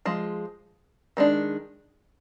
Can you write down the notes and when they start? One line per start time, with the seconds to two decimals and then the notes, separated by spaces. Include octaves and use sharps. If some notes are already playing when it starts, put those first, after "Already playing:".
0.05 F3 G#3
1.17 D#3 G#3 D4